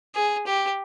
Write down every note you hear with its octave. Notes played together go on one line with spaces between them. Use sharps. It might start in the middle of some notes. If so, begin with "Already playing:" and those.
G#4
G4